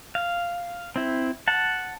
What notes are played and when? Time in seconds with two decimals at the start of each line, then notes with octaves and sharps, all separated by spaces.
0.15 F5
0.96 C4 E4
1.48 F#5 A5